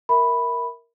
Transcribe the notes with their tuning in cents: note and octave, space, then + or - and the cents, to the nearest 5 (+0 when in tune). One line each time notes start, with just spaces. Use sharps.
A#4 +0 E5 -15 B5 +0